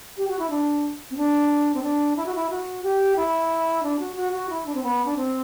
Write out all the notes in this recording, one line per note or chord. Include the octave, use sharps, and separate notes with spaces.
G4
F#4
E4
D4
C4
D4
C4
D4
E4
F#4
E4
F#4
G4
E4
D4
F#4
F#4
F#4
E4
D4
C4
B3
D4
C4